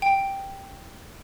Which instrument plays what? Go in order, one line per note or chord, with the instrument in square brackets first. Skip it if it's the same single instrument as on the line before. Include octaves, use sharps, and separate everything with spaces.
[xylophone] G5